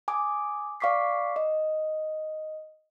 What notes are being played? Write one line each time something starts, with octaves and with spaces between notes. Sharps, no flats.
G#5 D6 D#6
D5 F5 C#6 D6 B6 C7
D#5